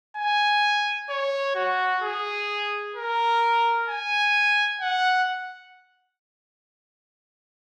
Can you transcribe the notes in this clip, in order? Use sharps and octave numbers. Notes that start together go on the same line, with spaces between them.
G#5
C#5
F#4
G#4
A#4
G#5
F#5